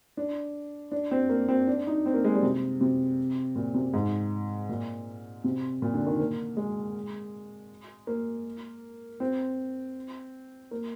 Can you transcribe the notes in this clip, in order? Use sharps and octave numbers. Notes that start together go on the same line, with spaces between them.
D4
D4
C4
A#3
C4
D4
D#4
C4
A#3
G#3
G3
C3
C3
A#2
C3
G#2
A#2
C3
A#2
D3
D#3
A#3
G#3
A#3
C4
A#3